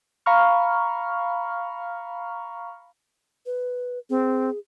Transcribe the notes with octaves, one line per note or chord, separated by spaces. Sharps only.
F5 A#5 B5 C#6 F6
B4
C4 G#4